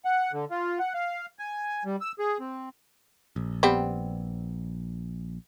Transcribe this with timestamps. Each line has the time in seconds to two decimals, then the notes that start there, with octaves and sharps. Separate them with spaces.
0.05 F#5
0.32 D3
0.51 F4
0.79 F#5
0.94 F5
1.39 G#5
1.85 G3
2.01 E6
2.19 G#4
2.40 C4
3.36 A#1
3.63 G3 B3 C4